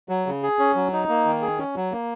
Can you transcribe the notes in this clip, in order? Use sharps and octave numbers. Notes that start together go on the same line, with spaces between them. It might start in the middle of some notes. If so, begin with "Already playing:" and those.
F#3
C#3
G#4
C#4
F#3
D#4
A#3
D#3
G#4
C#4
F#3
A#3